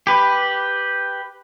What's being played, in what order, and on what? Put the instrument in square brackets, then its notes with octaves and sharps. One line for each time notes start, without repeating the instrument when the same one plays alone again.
[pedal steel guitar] G4 B4